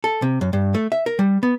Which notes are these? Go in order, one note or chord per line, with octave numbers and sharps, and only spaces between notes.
A4
C3
F#2
G2
A3
E5
A#4
G3
B3